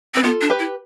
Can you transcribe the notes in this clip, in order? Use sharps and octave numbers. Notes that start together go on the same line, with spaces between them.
C4 B4
B3 F4 A4
D4
G4 B4
E4